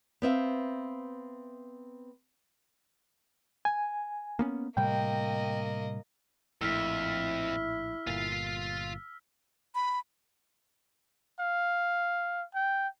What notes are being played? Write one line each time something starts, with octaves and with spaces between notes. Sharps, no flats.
B3 C4 E5 F5
G#5
A#3 B3 C#4
A2 C3 G3 A#3 D#5 G5
A#1 F2 A2 E4 E6 F6 B6
G1 A#2 F4 F5
B5
F5
G5